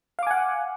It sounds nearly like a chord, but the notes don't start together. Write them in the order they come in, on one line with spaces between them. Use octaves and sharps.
F5 D6 G#5 F#5